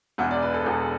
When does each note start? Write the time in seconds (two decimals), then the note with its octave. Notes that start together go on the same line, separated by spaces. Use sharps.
0.18 E1 E2 B2 F#5
0.31 D5
0.42 B4
0.54 A4
0.65 E1 E2 B2 A4